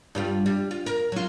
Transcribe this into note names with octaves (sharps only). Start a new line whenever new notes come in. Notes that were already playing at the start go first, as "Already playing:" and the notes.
G2 G3 F4
G3
F4
A#4
F#3 F4